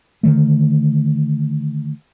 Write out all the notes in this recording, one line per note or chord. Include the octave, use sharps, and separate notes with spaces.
D3 D#3 A3